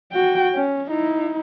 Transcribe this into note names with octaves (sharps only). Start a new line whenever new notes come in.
F#4 G5
C#4
D#4 E4